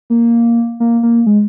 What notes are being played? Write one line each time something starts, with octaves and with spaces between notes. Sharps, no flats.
A#3
A#3
A#3
G#3